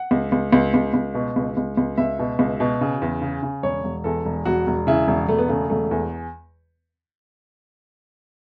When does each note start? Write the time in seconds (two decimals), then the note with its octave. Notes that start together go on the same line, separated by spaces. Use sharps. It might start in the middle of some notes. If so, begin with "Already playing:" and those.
Already playing: F#5
0.11 C#2
0.32 C#2
0.53 C#2
0.74 C#2
0.94 C#2
1.14 B2
1.36 C#2
1.57 C#2
1.77 C#2
1.97 C#2 E5
2.19 B2
2.39 C#2
2.60 B2
2.81 C#3
3.02 E2
3.22 C#3
3.43 C#3
3.63 E1 C#5
3.84 E1
4.04 E2 A4
4.26 E1
4.45 E1 F#4
4.67 E1
4.87 C#3 E4
5.08 E1
5.28 E1 A3
5.38 B3
5.48 C#3 A3
5.70 E1 A3
5.91 E2